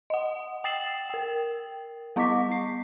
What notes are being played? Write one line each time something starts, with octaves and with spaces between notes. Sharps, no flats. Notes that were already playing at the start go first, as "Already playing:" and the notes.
D#5 F#5
G5 D#6 A6 C7 E7 F#7
A#4 G5
G3 B3 D#5 C#6 D6 B6
C7